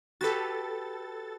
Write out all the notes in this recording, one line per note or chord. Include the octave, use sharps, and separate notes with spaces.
F#4 G4 A4 B4 A6